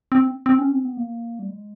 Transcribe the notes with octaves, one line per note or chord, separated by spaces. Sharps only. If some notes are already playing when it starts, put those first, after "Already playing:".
C4
C4
C#4
C4
B3
A#3
G3
G#3